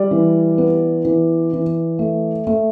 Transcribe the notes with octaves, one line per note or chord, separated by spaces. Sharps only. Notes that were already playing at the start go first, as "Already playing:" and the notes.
Already playing: G3 D5
E3
B3
E3
E3
A3
A3